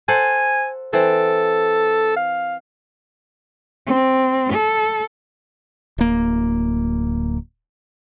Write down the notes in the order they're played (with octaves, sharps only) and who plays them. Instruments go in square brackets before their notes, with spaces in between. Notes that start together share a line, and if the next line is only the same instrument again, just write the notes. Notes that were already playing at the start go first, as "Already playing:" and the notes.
[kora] A4 C5 F#5 [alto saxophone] G#5
[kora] E3 C4 [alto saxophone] A4
[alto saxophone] F5
[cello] C4
A4
[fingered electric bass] D1 A#3